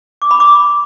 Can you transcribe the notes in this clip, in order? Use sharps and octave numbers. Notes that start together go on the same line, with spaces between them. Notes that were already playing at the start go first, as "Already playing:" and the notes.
D6
B5
D6